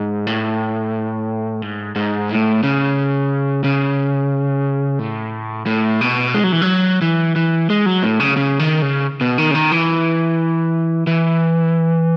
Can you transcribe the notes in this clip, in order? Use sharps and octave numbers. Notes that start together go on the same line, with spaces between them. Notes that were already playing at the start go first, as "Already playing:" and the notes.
Already playing: G#2
A2
G#2
G#2
A2
C#3
C#3
A2
A2
B2
G#3
F#3
E3
F#3
E3
E3
G#3
F#3
A2
C#3
C#3
D#3
C#3
B2
D#3
C#3
D#3
E3
E3